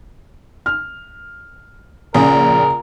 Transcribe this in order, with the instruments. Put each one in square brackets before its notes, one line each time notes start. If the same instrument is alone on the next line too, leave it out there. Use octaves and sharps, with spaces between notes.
[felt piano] F6
[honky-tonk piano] A#1 [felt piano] C#3 G#4 [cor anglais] A#4